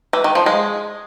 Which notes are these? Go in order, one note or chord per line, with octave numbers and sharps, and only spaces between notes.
E3
D#3
F3
G#3